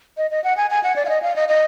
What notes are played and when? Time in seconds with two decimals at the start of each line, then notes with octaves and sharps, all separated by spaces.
0.17 D#5
0.31 D#5
0.44 F#5
0.57 G#5
0.70 G#5
0.83 F#5
0.96 D5
1.05 F5
1.09 D#5
1.23 F5
1.36 D#5
1.49 D#5